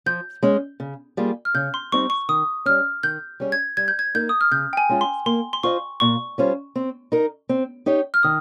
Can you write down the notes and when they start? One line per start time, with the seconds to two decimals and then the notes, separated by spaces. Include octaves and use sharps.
0.06 F3 G6
0.43 G#3 C#4
0.80 C#3
1.17 G3 A#3 F4 G#4
1.45 F6
1.54 C#3 G6
1.74 C6
1.92 G3 C4 D#4 C#6
2.10 C#6
2.29 D#3 D#6
2.66 G3 C#4 F6
3.03 D#3 G6
3.40 G3 C#4 G#4
3.52 G#6
3.77 G3 G#6
3.88 G6
3.99 G#6
4.14 A#3 D#4 A#4 G6
4.29 D#6
4.41 F6
4.51 C#3 G6
4.73 G5
4.77 G#5
4.89 G#3 C#4 F4
5.01 C6
5.26 A#3 C6
5.53 C6
5.63 F4 C5 D#5 C#6
6.00 A#2 C#6
6.38 G3 C#4 F4 C5
6.76 C4
7.12 D#4 A#4
7.49 C4
7.86 D#4 G4 C#5
8.14 F6
8.23 D#3 D#6